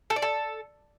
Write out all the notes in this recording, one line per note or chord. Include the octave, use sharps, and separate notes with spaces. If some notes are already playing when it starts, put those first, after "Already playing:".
A4
D5
A4